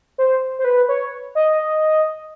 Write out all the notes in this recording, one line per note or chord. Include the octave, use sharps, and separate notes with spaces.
C5
C5
B4
C#5
D#5